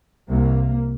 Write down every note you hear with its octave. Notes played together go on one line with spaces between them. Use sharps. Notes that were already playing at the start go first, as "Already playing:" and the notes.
C2 C3 A#3